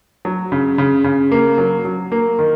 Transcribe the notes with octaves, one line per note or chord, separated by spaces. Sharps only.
F#3
C#3
C#3
C#3
A#3
F#3
F#3
A#3
D#3